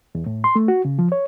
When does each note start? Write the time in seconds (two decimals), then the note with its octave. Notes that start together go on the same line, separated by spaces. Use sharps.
0.15 E2
0.26 A2
0.44 C6
0.56 A3
0.68 F#4
0.85 C#3
0.99 F3
1.12 C#5